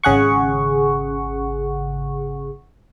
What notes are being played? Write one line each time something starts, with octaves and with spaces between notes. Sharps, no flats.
G#1 C#3 G#4 F#5 C#6